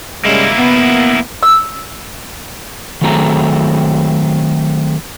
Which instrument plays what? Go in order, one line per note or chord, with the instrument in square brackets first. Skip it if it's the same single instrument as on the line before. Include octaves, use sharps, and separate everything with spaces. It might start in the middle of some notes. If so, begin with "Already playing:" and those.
[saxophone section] G3 G#3 C#4 [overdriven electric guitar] A#3 E4
[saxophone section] B3
[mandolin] E6
[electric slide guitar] D#3 F#3 A3 C4 G#4 A#5